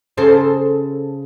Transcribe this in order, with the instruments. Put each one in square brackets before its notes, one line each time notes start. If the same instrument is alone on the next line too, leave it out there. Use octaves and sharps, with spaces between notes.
[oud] C#3 A4 C5